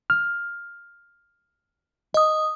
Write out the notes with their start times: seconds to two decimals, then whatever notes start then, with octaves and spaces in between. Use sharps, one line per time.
0.10 F6
2.14 D#5 D#6